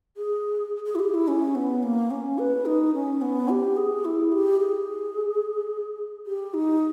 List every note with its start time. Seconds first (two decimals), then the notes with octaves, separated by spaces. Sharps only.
0.17 G#4
0.86 G#4
0.95 E4
0.99 G4
1.14 E4
1.28 C#4
1.55 B3
1.83 A#3
2.11 C#4
2.38 B4
2.66 D#4
2.94 C#4
3.22 B3
3.49 G4
3.77 G#4
4.05 E4
4.32 G4
4.60 G#4
6.26 G4
6.54 D#4